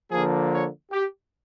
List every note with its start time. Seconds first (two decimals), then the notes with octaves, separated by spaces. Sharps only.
0.11 D3 F3 A#3 G#4
0.52 C#5
0.92 G4